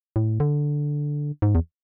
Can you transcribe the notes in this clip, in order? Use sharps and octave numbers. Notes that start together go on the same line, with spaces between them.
A2
D3
G#2
E2